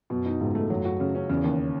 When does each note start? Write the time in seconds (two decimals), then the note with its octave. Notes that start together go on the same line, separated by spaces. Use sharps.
0.10 F#2 B2
0.26 D#4
0.40 C#2 G#2
0.55 A3
0.70 F#2 F#3
0.85 F#4
1.00 C#3
1.15 C#4
1.29 E2 C#3
1.44 D#2